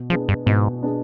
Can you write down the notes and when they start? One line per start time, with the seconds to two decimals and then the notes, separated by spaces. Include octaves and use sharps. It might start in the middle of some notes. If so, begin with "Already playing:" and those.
Already playing: B2
0.10 F3 B3 D4 G#4
0.29 G2
0.46 G#2 B2
0.83 B3 D4 G#4